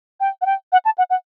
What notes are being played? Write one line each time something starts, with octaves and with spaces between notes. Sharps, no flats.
G5
F#5
G5
F#5
A5
F#5
F#5